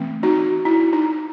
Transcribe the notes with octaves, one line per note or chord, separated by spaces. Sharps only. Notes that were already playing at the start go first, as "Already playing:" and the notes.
Already playing: E3 A3 C4
D#4 F#4
E4
D#4